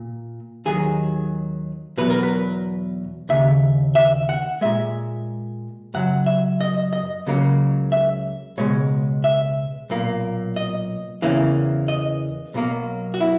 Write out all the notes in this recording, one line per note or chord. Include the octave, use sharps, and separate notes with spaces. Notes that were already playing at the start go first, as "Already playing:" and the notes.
Already playing: A#2
D#2 D#3 F#3 G#4
E2 B2 F#3 B4
A#4
B4
D#2 C#3 E5
E5
F#5
A#2 G#3 E5
F#2 C#3 F#3 F#5
E5
D#5
D#5
C#2 C#3 F#3 A#3
E5
C#2 B2 G#3 C#5
E5
B1 A#2 A#3
D#5
E2 C#3 E3 A#3
D#5
B1 B2 F#3 A#3
F#4
E4